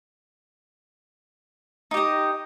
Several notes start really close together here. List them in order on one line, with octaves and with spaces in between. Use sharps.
D#4 G4 D#5